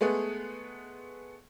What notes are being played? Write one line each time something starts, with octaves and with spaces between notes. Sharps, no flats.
G#3 A3 B3 G#4